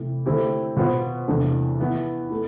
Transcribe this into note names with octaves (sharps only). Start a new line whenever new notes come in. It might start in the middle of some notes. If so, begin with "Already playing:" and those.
Already playing: C3 E3 A3
D3 A3 C4 E4 G4
B2 B3 F4 C5
E2 C3 E3 A3 D4
E3 B3 E4
A3 E4